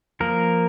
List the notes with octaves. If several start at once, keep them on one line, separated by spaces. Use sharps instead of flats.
F3 A#3 A#4